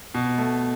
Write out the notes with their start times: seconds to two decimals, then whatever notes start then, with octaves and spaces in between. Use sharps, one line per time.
0.14 B2
0.38 A3